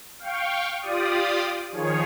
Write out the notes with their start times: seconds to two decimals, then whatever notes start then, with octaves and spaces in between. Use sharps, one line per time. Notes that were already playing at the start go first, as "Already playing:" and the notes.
0.19 F5 G5 C#6
0.81 F4 G4 D5 D#6
1.71 D#3 F3 G#4 C#5